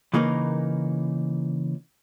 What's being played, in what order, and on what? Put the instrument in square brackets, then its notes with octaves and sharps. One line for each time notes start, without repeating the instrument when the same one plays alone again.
[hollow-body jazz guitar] C#3 E3 A#3 D#4 A#4 B4